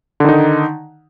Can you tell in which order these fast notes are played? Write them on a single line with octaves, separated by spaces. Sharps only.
D3 D#3 D#4